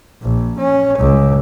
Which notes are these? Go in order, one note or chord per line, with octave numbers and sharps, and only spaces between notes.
A#1
C#4
C#2